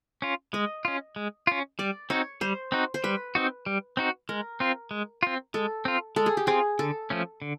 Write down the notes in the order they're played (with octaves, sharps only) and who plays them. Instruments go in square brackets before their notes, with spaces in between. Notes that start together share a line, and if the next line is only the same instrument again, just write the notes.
[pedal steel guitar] C#4 F4
[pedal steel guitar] G#3 [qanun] D#5
[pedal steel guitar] C#4 F4
G#3
C#4 F4
[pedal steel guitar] G3 [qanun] D5
[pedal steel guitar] C4 D#4 F#4 [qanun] C#5
[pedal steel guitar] G3 [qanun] C5
[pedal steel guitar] C4 D#4 F#4
[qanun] C5
[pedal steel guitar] G3 [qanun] B4
[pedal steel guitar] C4 D#4 F#4
G3
C4 D#4 F#4
[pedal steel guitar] G#3 [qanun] A#4
[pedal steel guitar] C4 F4
G#3
C4 F4
[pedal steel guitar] G#3 [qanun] A4
[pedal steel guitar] C4 F4
[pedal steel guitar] G#3 [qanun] A4
[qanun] G#4
G4
[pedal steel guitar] C4 F4 [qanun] G#4
[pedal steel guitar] D3 [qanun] A4
[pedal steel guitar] F3 A3 C#4
D3